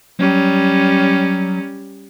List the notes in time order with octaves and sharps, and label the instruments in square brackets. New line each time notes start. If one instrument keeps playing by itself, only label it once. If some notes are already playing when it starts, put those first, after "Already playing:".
[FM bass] F#3 [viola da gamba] G3 C#4